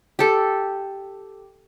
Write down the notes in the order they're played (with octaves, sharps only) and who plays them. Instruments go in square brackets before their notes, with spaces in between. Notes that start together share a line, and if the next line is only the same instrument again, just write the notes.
[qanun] G4 A4